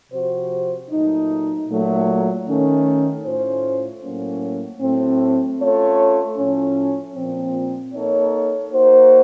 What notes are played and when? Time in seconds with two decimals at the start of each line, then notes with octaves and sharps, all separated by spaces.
0.12 C3 F3 C4 F#4 C5
0.90 A#2 F#3 A3 D#4
1.68 A#2 F#3 A3
2.47 D#3 A3 C#4
3.24 A2 A3 C#4 F4 C5
4.02 A2 F#3 A#3 C#4
4.80 A2 F#3 A3 C4
5.59 A3 C#4 F4 A4 C#5
6.37 A2 F3 A3 C#4
7.15 A#2 F3 C4
7.93 A#3 D#4 A4 C#5
8.70 A#3 D#4 F#4 C5